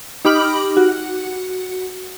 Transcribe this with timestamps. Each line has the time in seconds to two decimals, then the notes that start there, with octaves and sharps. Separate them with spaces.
0.25 D#4 G4 B5 D6 F6 F#7
0.77 F#4